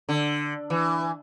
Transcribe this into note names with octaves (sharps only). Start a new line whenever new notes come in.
D3
E3